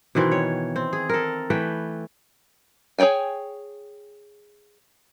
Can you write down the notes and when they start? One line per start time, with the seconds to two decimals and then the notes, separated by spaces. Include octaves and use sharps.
0.15 B2 D#3 E3 C4
0.32 C#5
0.76 C4
0.93 G#4
1.09 A4 A#4
1.50 E3 A3 B4 G5
2.98 G#4 C#5 D5 G5 G#5